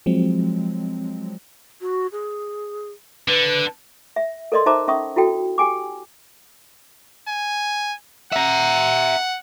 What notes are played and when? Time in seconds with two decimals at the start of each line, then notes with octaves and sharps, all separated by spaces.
0.06 F3 F#3 G#3 C4
1.81 F#4
2.12 G#4
3.28 D3 B4
4.16 E5
4.52 A4 A#4 D5 D#5 C6
4.66 D#4 C5 E5 A5 A#5 D6
4.88 C#4 E5 C#6 D#6
5.16 E4 F#4 A4 G5
5.58 G4 G5 G#5 D6
7.28 G#5
8.32 E5 F#5 A#5